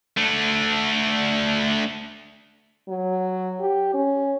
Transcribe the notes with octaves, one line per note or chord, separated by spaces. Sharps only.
A3 D4
F#3
G4
C#4